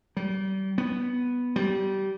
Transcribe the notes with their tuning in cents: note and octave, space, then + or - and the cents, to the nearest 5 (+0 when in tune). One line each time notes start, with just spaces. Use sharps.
G3 -35
B3 -5
G3 -20